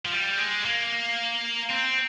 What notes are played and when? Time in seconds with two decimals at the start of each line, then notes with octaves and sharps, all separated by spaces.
0.06 F3
0.12 G3
0.37 G#3
0.65 A#3
1.71 C4